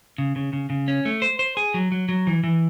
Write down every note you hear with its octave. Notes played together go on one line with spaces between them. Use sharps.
C#3
C#3
C#3
C#3
C#4
A3
C5
C5
G#4
F#3
F#3
F#3
E3
E3